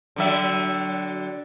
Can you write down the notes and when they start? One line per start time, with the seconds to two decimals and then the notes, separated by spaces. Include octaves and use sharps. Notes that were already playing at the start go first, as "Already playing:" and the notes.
0.16 D3 F#3 E5